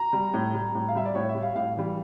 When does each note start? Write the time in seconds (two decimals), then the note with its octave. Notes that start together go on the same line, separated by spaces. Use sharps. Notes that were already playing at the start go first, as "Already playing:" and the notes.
Already playing: A#5
0.13 G3
0.34 A2
0.54 G3
0.75 A2
0.88 F5
0.95 G3 E5
1.05 D5
1.15 A2 C#5
1.29 E5
1.35 G3
1.42 F5
1.55 A2 F5
1.77 E3 G3